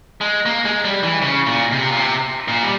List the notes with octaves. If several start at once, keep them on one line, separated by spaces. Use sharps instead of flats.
G#3
A#3
G#3
G3
E3
C#3
A#2
C3
A#2
C3
A#2
G3